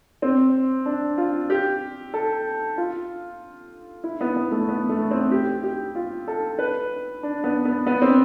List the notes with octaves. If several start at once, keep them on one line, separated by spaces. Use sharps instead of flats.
C4
D4
F4
G4
A4
F4
E4
B3
B3
A3
B3
A3
C4
G4
G4
F4
A4
B4
D4
B3
B3
B3
C4